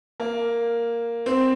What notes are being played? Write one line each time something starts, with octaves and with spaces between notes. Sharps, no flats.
A#3
C4